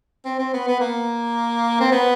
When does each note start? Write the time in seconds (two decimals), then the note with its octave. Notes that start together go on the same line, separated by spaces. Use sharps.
0.25 C4
0.39 C4
0.54 B3
0.68 B3
0.80 A#3
1.80 C4
1.92 B3